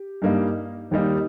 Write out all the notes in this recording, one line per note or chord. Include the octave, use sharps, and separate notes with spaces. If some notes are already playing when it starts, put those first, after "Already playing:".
Already playing: G4
G2 G3 A#3 D#4
D#2 D#3 G3 A#3 D#4